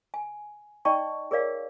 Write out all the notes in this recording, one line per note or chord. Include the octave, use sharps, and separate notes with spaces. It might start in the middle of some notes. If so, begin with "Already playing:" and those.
G#5
D#4 D5 D#5 G5 A5 C#6
G#4 A#4 C#5 D5 F5